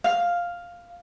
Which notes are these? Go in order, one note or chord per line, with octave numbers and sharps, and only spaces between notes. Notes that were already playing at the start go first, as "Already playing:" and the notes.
F5